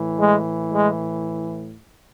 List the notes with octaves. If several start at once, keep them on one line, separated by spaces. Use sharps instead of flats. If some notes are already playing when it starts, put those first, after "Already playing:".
Already playing: A2 E3
G#3
G#3